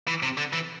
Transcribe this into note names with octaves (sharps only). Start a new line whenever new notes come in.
E3
C3
D3
E3